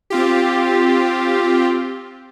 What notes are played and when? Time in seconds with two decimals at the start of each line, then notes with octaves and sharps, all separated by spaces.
0.10 C4 F4 G4